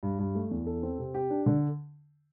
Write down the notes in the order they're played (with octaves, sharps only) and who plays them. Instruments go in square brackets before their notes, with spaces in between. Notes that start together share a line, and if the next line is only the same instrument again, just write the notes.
[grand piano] G2
G2
A3
E2
A4
C4
C3
G4
D4
D3